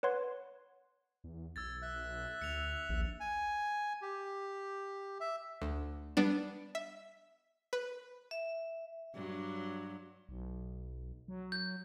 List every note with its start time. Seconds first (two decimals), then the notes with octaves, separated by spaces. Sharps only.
0.03 B4 C#5 F#5 C6 G#6
1.24 E2
1.56 B1 E6 G#6 A6
1.82 E5 F#6
2.41 D2 C#7 F7
2.89 A#1 D#2
3.20 G#5
4.02 G4
5.20 E5
5.62 D2
6.17 G3 B3 D4
6.75 E5
7.73 B4
8.31 E5
9.14 G2 F#3
10.29 B1
11.28 F#3
11.52 G6